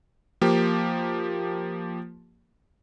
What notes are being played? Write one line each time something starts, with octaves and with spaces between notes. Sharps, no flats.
F3 A#3 G4